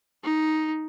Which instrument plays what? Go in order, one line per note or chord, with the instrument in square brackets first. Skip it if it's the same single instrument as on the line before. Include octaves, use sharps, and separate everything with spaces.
[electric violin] D#4